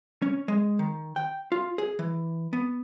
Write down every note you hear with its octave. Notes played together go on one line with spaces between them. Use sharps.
C#4
G#3
D#3
G5
F4
G#4
E3
B3